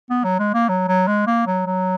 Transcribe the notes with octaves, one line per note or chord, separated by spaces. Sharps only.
B3
F#3
G#3
A#3
F#3
F#3
G#3
A#3
F#3
F#3